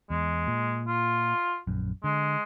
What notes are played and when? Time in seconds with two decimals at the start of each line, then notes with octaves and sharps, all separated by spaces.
0.10 E2 G#3
0.47 A#2
0.87 F4
1.67 A#1 F#2
2.04 D3 G#3